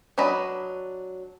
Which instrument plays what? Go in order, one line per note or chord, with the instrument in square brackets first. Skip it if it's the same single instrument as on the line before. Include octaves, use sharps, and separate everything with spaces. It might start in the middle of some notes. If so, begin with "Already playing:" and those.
[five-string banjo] F#3 D4 B4 D#5